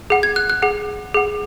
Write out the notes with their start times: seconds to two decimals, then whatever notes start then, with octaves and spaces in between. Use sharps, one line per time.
0.10 G#4 F#5
0.23 G#6
0.36 F#6
0.50 F#6
0.62 G#4 F#5
1.14 G#4 F#5